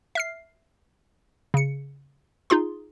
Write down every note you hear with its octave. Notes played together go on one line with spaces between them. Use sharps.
E5 F6 C7
C#3 C#7
D#4 F4 G#4 C6